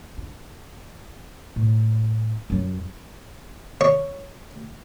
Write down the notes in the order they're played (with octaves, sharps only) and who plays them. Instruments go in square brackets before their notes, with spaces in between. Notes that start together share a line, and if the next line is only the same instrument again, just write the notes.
[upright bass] D4
A2
F#2 F#3
[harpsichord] C#5